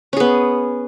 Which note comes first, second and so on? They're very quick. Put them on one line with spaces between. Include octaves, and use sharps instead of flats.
C#4 G#4 B3